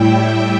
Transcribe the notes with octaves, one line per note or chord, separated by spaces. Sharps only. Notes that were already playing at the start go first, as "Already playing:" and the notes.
Already playing: A2 G3 E4 E5 G5